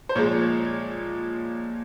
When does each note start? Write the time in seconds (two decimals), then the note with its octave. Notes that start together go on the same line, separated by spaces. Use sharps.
0.09 C5
0.15 A#2 F3 G#3 C#5